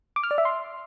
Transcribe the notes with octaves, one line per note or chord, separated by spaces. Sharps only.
D6
F6
D5
E5
C6